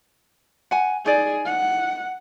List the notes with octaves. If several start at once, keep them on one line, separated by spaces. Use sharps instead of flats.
F#5 G#5
D#4 G#4 D5
F#5